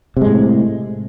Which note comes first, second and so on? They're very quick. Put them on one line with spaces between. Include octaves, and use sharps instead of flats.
C3 G#3 A2